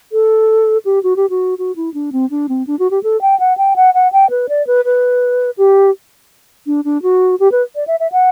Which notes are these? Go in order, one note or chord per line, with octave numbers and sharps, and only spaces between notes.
A4
G4
F#4
G4
F#4
F#4
E4
D4
C4
D4
C4
D4
F#4
G4
A4
G5
F#5
G5
F#5
F#5
G5
B4
D5
B4
B4
G4
D4
D4
F#4
G4
B4
D5
E5
E5
F#5